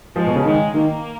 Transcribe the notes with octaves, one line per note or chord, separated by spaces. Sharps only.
F3 G#3
B2
C#3
D#3 G#3
D#3 A#3